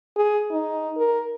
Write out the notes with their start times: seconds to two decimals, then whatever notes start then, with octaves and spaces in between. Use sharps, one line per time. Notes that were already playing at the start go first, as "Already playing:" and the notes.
0.17 G#4
0.51 D#4
0.97 A#4